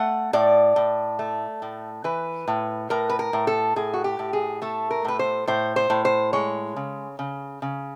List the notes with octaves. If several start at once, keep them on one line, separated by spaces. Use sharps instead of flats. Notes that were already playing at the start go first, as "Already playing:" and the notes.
Already playing: A3 F#5
A2 D5
A2
A3
A2
E3 B4
A2
A2 A#4
B4
A#4
A2
A4
A2 G#4
F#4
G4
A2
G#4
A3 A4
A#4
A2 B4
C5
A2 C5
C5
A2
C5
G#3 C#5
C#3
C#3
C#3